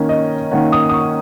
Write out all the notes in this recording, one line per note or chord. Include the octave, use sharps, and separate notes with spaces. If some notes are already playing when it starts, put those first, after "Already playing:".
Already playing: D#3 A#3 C#4
D#5
D#3 A#3 C#4 F#5
D#6
D#6
C#6